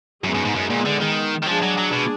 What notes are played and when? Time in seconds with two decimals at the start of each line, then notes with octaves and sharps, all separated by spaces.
0.24 F#2 G#3 B3 D#4 G#4
0.34 F#2
0.45 G#2
0.55 F#2
0.70 A#2
0.85 D3
1.01 D#3
1.43 D#3
1.46 F3 G#3 D4 G#4 D5
1.62 F#3
1.77 F#3
1.93 B2